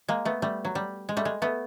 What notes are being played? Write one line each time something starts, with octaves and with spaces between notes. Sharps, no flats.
G#3 A#3
A3 B3
G3 A3
F#3
G3
G#3
G3 A3
G#3
A3 B3